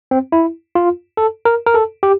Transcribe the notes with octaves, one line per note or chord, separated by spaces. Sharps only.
C4
E4
F4
A4
A#4
A#4
A4
G4